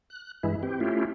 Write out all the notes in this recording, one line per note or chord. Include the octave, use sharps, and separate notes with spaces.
F#6
G2 E3 G#3 E4
C4 G4
A3 C#4 E4 F4 G4